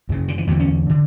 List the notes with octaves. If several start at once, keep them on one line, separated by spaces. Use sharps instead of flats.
F#2 C#3
D3
E3
E2 D3 F#3
C#4
D3